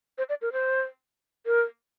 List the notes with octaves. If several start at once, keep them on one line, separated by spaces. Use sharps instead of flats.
C5
D5
A#4
C5
A#4